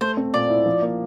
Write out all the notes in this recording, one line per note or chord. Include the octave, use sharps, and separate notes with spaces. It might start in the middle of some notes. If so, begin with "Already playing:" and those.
A3 C5
C4
A#2 D5
E4
F3
A#3